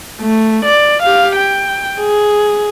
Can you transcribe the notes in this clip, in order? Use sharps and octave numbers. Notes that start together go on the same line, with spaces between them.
A3
D5
G4 F5
G5
G#4